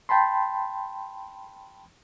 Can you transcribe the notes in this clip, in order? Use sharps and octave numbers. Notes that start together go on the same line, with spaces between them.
G5 A5 B5 C6